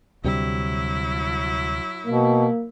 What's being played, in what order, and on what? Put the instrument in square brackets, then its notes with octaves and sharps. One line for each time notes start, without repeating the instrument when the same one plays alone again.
[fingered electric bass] D2 C3 G3 [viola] F#3 E4
[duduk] B2 [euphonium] A#3